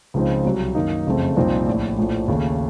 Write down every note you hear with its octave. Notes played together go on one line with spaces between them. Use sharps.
C#2 C#3 F3 C4 D#4
C2 C3 F#3
F#2 D#3 A#3 D#4
F#1 F2 C#3 A3 C4
C2 A#2 F3 C4 D#4
A#1 A2 A3
A#1 A2 F3 A3
D#2 C#3 A3